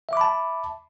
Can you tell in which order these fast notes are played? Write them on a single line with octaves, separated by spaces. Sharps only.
E5 D6 B5 A5